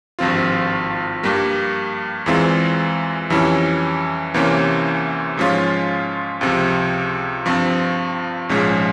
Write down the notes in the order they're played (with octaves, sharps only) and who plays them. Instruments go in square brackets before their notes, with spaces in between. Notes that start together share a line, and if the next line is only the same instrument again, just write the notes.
[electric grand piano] G#1 G2 F3 C4 F4
G2 G3 A#3
E2 E3 G#3 C4 F4
F2 E3 G3 C#4 E4
C2 C3 E3 A#3 C#4
G#2 F3 G#3 C#4 F4
C#2 C3 F3
G2 F3 C4
A#1 G#2 F3 G#3 C#4